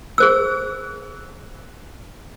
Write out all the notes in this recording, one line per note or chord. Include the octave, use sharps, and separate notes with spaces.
G#4 C5 E6